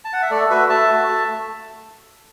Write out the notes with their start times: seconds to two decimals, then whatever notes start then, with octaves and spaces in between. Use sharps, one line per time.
0.05 A5
0.13 F#5
0.22 E5
0.31 A3 A4 D5
0.50 F#4 B4 E5
0.69 A3 E5 A5
0.89 F#4
1.08 A3